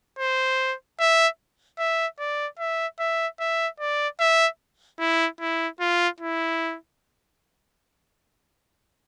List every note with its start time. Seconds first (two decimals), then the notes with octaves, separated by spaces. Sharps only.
0.19 C5
1.00 E5
1.79 E5
2.19 D5
2.59 E5
2.99 E5
3.40 E5
3.80 D5
4.20 E5
4.99 E4
5.40 E4
5.80 F4
6.20 E4